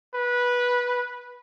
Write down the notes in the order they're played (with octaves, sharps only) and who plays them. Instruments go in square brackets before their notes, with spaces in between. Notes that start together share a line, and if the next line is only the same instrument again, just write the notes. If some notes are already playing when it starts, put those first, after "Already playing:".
[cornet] B4